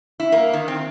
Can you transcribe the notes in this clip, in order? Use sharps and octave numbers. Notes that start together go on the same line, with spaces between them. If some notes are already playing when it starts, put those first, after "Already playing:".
E4
A#3
D#3
C4